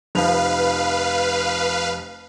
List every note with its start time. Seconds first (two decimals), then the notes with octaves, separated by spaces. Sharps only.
0.15 F1 F3 B4 F5 F7